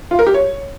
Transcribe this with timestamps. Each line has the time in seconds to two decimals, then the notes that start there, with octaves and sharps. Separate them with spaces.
0.11 F4
0.19 A#4
0.27 G4
0.34 C#5